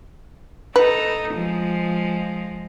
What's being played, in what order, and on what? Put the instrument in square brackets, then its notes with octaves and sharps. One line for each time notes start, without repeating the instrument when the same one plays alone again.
[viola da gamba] D#4 A4 [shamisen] B4
[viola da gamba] F3 G#3